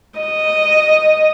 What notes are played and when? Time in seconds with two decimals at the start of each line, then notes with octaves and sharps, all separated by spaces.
0.19 D#5